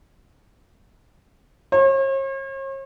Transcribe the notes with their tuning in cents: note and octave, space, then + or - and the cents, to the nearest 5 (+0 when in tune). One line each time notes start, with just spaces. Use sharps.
C#5 -45